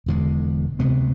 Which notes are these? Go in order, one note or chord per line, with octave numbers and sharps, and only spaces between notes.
E1 E2 D3 G#3
D2 C3 G#3 B3